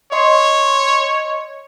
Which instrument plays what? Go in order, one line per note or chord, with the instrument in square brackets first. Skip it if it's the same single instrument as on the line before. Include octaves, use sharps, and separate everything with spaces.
[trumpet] C#5 [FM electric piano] D#5 C6